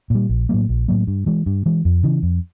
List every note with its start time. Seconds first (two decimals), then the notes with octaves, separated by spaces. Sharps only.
0.10 A#2 G3
0.29 A#1
0.49 A2 F#3 A#3
0.69 A#1
0.88 A2 F#3 A#3
1.07 G2
1.26 E3 G#3
1.46 G2
1.66 E3 G#3
1.85 F2
2.03 C#3 E3
2.23 F2